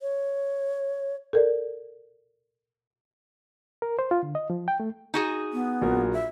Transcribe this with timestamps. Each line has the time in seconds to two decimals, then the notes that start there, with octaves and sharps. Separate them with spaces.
0.02 C#5
1.33 A4 A#4 D5
3.82 A#4
3.99 C5
4.11 F4
4.23 D3
4.35 D#5
4.50 F3
4.68 G5
4.80 A3
5.14 D#4 F#4 G#4
5.53 B3
5.81 A#1 F#3 A#4
6.13 E5